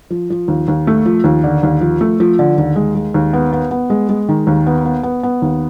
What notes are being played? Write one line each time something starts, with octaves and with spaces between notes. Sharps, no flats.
F3
F3
D#2
D#2
A3
F3
D#2
D3
D#2
F3
A3
F3
D3
D#2
G#3
G#3
D#2
B3
B3
B3
G#3
G#3
D#3
D#2
B3
B3
B3
B3
D#2